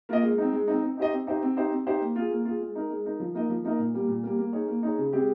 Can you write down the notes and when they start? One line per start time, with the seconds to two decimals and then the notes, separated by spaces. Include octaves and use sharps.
0.09 A#3 F4 A#4 D#5
0.23 G#3
0.38 C4 D#4
0.53 G#3
0.68 C4 D#4
0.83 C4
0.97 D#4 G4 C5 D#5
1.12 C4
1.27 D#4 G4 C5 D#5
1.42 C4
1.57 D#4 G4 C5
1.72 C4
1.86 D#4 G4 C5
2.01 A#3
2.16 F4 G#4
2.31 A#3
2.45 F4 G#4
2.60 G#3
2.75 D#4 A#4
2.90 G#3
3.05 D#4 A#4
3.20 F3
3.34 A#3 D#4 A#4 D#5
3.49 F3
3.64 A#3 D#4 A#4 D#5
3.79 A#2
3.94 G3 A#3
4.08 A#2
4.23 G3 A#3
4.38 A#3
4.53 D#4 G#4 C#5
4.68 A#3
4.83 D#4 G#4 C#5
4.98 C#3
5.13 G#3 C4 G4